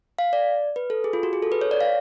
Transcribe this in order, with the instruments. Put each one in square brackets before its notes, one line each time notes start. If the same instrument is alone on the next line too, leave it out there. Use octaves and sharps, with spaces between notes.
[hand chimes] F5
D5
B4
A4
G#4
F4
F#4
G#4
A4
B4
C#5
D5
F5